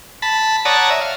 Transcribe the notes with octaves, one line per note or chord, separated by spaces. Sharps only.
A5 B5
C#5 D5 F#5 A5 A#5 D#6
E5
F5